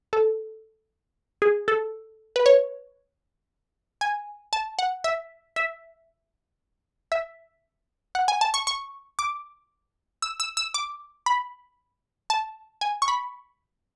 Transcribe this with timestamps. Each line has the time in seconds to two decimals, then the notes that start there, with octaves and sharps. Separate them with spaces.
0.13 A4
1.42 G#4
1.68 A4
2.36 B4
2.46 C#5
4.01 G#5
4.53 A5
4.79 F#5
5.04 E5
5.56 E5
7.12 E5
8.15 F#5
8.28 G#5
8.41 A5
8.54 C#6
8.67 C#6
9.19 D6
10.22 E6
10.40 E6
10.57 E6
10.74 D6
11.26 B5
12.30 A5
12.81 G#5
13.02 C#6
13.08 B5